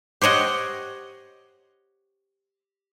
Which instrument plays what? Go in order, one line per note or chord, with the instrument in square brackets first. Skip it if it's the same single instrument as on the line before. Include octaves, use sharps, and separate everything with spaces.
[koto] G4 C5 C#5 D#5 F#5